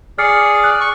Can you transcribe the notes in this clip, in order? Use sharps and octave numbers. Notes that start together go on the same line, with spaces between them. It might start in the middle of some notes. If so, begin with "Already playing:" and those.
G#4 D5 F6 C7 C#7
F#6
C#6